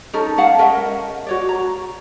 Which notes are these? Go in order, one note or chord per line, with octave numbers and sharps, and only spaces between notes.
C#4 D#4 A4 A#4
C#4 F5 F#5 A5
C#4 A#4 D#5 E5
F#4 C#5 D5
A#5